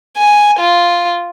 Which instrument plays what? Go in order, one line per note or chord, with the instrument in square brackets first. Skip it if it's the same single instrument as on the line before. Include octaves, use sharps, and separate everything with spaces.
[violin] G#5
F4